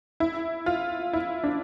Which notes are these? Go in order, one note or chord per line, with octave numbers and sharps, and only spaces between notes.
E4
F4
E4
D4